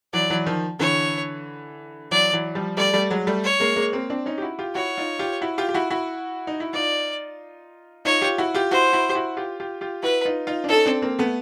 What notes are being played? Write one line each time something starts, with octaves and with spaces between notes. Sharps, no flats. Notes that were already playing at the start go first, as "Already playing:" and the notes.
E3 F#3 D5
E3 F#3
D#3 F3
D3 E3 C#5
E3 F#3 D5
E3 F#3
F3 G3
G3 A3 D5
G3 A3
F#3 G#3
G3 A3
C#5
G#3 A#3
G#3 A#3
A#3 C4
C4 D4
C#4 D#4
G4
E4 F#4
F4 G4
E4 F#4 C#5
D#4 F4
F4 G4
E4 F#4
F4 G4
G4
E4 F#4
E4 F#4
D#4
E4
D#4 F4 D5
D#4 F4 C#5
F4 G4
E4 F#4
F4 G4
E4 F#4 C5
E4 F#4
G4
E4 F#4
F4 G4
F4 G4
F4 G4
E4 F#4 B4
D#4 F4
D#4 F4
D4
C#4 D#4 A4
C4 D4
A#3 C4
A3 B3